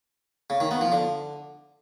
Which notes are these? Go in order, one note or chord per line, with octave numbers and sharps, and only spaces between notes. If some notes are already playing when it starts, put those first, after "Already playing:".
C#3
D#3
B3
F3
D3